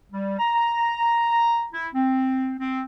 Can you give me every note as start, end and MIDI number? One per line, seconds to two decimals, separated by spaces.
0.11 0.34 55
0.39 1.66 82
1.73 1.88 64
1.94 2.53 60
2.60 2.81 60